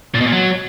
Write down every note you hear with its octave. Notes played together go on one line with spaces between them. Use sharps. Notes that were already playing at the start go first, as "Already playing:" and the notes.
A#2
B2
A#2
F#3